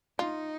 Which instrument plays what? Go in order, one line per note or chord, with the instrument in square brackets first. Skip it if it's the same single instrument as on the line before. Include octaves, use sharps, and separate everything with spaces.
[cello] D#4 [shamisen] F4